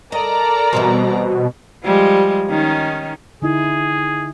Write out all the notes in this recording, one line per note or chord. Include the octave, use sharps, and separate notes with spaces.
A4 A#4 D5 D#5 A#5
B2 E3 G3 C4
F3 G3 G#3
D#3 C#4 D#4
D3 D#4 E4 G#4